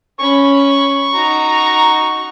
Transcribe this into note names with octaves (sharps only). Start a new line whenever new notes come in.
C#4 B5 C#6
D#4 F#4 A#5